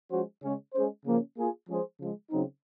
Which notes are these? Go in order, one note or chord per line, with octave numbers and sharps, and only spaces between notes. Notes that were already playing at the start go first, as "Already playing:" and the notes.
F3 G#3 C#4 F#4 C5
C#3 G#3 C#4
G#3 C#4 G#4 C5
C#3 F3 A#3 C#4
A#3 F4 G#4
F3 G#3 C#4 G#4 C5
C#3 F3 G#3
C#3 F#3 C4 D#4